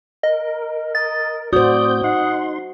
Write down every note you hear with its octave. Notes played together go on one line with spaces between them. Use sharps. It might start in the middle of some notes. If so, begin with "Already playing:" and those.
A#4 D#5
D#5 A6
A2 C4 F#4 C5 D5 D#6 G6
D#4 F#5 C6